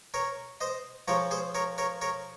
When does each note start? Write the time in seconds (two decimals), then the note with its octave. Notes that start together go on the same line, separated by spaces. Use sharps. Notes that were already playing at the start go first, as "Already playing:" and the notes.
0.14 A#4 C#5
0.61 C5 D#5
1.08 C#3 F3 A#4 C#5
1.31 G#4 C5
1.55 A#4 C#5
1.78 A#4 C#5
2.01 A#4 C#5